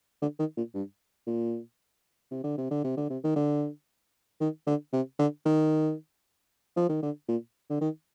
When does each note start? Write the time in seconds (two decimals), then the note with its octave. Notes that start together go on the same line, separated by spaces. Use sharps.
0.22 D3
0.39 D#3
0.57 A#2
0.74 G2
1.27 A#2
2.31 C3
2.44 D3
2.58 C3
2.71 D3
2.84 C3
2.97 D3
3.10 C3
3.24 D#3
3.36 D3
4.41 D#3
4.67 D3
4.93 C3
5.19 D3
5.45 D#3
6.77 F3
6.89 D#3
7.02 D3
7.28 A#2
7.70 D3
7.81 D#3